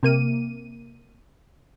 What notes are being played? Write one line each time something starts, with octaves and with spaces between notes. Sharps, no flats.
C3 A#3 D#7